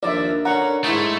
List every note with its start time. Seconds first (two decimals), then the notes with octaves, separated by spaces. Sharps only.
0.03 D#2 F3 D4 A#4 D5 E5
0.45 D3 C#4 F#5 A#5
0.84 G#2 A3 E4 G#4 C6 C#6